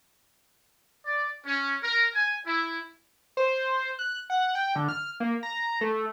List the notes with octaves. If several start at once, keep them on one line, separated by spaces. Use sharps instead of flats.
D5
C#4
A#4
G#5
E4
C5
F#6
F#5
G5
D3
F6
A#3
A#5
A3